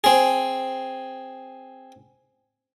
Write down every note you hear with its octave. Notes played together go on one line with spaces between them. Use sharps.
C4 G#4